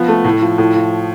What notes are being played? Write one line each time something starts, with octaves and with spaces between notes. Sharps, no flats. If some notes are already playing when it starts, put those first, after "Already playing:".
Already playing: F3 B3
A3
A2
F3
A2
F3